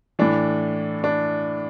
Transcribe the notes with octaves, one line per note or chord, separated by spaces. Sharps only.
A2 E3 D4
D4